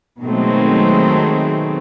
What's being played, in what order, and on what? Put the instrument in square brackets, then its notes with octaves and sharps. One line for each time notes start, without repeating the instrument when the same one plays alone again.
[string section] B2 D#3 F#3 G#3 A3 C4